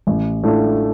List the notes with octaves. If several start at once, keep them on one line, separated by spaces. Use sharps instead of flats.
A1
A2 A3 D4 F4